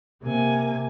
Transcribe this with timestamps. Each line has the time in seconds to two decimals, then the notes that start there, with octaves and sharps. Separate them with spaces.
0.22 C3 A#3 G#5